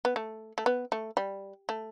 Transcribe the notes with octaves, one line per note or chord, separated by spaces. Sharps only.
B3
A3
A3
B3
A3
G3
A3